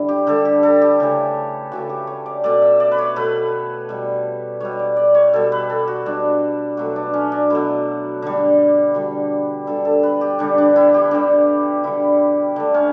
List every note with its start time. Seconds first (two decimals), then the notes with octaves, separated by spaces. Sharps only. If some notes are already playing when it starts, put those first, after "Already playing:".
Already playing: D3 G3 E4
0.08 G4
0.27 D3 G3 A4
0.45 G4
0.63 A4
0.81 G4
1.00 C#3 E3 A3
1.72 C#3 E3 A3 F#4
1.89 G4
2.07 C#5
2.26 D5
2.44 B2 A3 D5
2.62 E5
2.80 D5
2.92 B4
2.98 C#5
3.16 B2 A3 B4
3.89 B2 G3
4.60 B2 G3 C#5
4.79 D5
4.97 D5
5.15 C#5
5.33 B2 G3 A4
5.52 B4
5.70 A4
5.88 F#4
6.05 B2 G3 D4
6.77 B2 F#3 A3 F#4
6.96 D4
7.14 C#4
7.32 D4
7.50 B2 F#3 A3 E4
8.22 D3 G3
8.94 D3 G3 F#4
9.67 D3 G3 A4
9.85 A4
10.03 B4
10.21 G4
10.39 D3 G3 D4
10.58 D4
10.76 E4
10.94 G4
11.11 D3 G3 D4
11.84 D3 G3 E4
12.56 D3 A3 D4
12.74 C#4